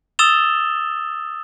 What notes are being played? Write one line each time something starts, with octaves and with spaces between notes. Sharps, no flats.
D#6 E6 A6 E7 F7 G7